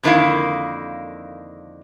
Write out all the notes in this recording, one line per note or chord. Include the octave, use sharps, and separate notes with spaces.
F2 D3 D#3 A#3 E4 F5